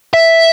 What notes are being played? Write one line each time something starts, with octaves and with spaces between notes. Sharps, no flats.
E5